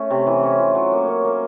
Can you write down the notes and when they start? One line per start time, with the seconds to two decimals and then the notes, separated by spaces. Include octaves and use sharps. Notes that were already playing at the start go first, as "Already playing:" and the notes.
Already playing: A3 C#4
0.10 C3
0.26 E3
0.43 C#4
0.59 F4
0.75 F#3
0.92 A#3
1.08 C#4
1.25 A#3